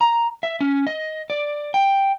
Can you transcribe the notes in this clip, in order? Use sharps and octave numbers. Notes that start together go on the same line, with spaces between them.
A#5
E5
C#4
D#5
D5
G5